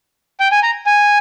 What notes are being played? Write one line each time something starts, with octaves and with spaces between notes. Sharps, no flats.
G5
G#5
A#5
G#5